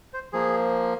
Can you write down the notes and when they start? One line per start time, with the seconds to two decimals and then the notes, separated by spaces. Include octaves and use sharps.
0.13 C5
0.33 F3 A#3 G#4